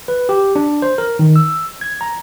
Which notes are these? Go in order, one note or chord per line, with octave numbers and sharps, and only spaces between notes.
B4
G4
D4
C5
A#4
D#3
E6
G#6
A#5